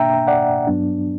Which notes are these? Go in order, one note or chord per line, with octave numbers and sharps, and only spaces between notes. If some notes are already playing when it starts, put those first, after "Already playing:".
Already playing: B2 A#3 D4 E5 G5 A#5
D5 F#5
G2 F#3 B3 D4